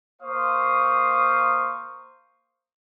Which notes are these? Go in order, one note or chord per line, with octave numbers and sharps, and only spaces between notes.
A#3 C5 F5 C#6 D#6